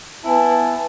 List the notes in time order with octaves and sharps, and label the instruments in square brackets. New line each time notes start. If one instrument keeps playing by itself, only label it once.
[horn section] B3 E4 G#5 A5